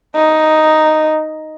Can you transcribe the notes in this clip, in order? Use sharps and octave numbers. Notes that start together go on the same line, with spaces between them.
D#4